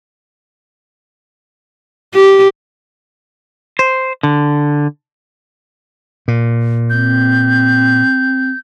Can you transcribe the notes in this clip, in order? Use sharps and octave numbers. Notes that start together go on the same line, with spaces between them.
G4
C5
D3
A#2
C4 G6